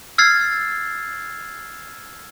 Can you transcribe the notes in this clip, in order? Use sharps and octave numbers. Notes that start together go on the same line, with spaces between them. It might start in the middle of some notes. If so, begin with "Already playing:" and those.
E6 F6 G#6 A6 C7